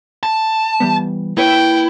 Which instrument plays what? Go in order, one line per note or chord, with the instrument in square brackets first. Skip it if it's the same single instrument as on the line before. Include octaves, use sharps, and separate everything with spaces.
[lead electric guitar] A5
[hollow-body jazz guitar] E3 G3 B3
[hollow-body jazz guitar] A#3 B4 C#5 [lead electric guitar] E4 [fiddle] G5